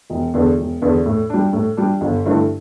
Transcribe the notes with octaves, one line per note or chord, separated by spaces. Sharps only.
E1
E2 D3 B3
E1
E2 D3 B3
A2
G3 D4
A2
G3 D4
G1
G2 D3 A3 E4